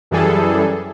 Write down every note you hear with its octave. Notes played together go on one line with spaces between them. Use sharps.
F#2 E3 G3 G#4 A4